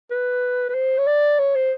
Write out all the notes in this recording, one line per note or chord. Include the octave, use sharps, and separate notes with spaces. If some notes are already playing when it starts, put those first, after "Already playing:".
B4
B4
C5
C#5
D5
C#5
C5